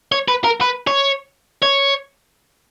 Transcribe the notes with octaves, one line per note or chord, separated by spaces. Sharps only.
C#5
B4
A#4
B4
C#5
C#5